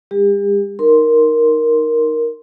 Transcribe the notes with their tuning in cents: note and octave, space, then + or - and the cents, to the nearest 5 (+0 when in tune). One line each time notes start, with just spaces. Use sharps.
G#3 -45 G4 +40
D#4 +0 A#4 +5 C6 +0